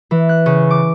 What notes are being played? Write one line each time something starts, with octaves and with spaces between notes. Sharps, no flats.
E3
F#6
C#3
D6